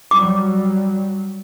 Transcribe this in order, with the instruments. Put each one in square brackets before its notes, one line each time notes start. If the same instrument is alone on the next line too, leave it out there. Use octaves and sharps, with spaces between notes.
[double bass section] F#3 G3 [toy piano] D6